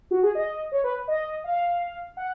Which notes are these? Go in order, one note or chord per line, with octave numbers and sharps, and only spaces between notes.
F#4
G#4
D#5
C#5
B4
D#5
F5
F#5